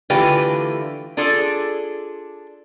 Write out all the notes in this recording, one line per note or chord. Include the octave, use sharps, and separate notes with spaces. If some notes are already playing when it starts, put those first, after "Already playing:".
D3 E3 A3 F4 G4 B4
D4 F4 G#4 A4